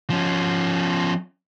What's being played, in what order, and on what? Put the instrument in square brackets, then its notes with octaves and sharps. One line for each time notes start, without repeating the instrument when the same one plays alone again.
[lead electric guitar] F3 C#4